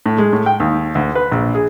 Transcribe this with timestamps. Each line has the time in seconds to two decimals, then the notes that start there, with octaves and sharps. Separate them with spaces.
0.06 A2
0.18 G#3
0.33 A2
0.46 G5
0.60 D#2
0.95 D2
1.15 B4
1.31 A#1
1.55 G#4